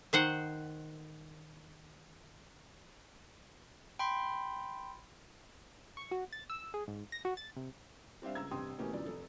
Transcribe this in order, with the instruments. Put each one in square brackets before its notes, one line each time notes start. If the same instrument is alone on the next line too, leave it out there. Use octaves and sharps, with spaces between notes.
[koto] D#3 C5 F#5
[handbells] G5 B5 C6
[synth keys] C#6
F#4
A6
E6
G#4
G#2
A#6
F#4
A6
C3
[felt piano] G3 C4 D4 E5 F5
C#2 A#5 E6 G#6
A1 G2 C3 G5 C6 D#6
B2 E3 A3 A#3 C#4 G4
G1 F#2 E3 F4 D5
F1 A4